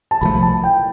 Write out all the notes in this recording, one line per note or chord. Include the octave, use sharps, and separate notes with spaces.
A5
C2 C3 F3 A3 B5
A5
G5